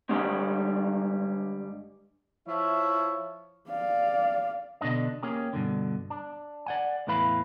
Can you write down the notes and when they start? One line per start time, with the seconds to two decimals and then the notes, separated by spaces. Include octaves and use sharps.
0.09 G2 D3 D#3 G3 G#3 C4
2.47 F3 E4 C#5 E5
3.70 D5 F5
4.81 B2 D3 D4 D#5
5.23 A#3 C#4 G4 G#4
5.53 G2 B2 D3
6.10 D4
6.66 D5 F#5 G#5
7.07 E2 A2 E4 B4 F5 B5